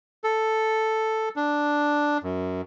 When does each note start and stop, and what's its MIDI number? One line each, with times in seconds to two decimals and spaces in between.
0.24 1.29 69
1.36 2.18 62
2.23 2.61 42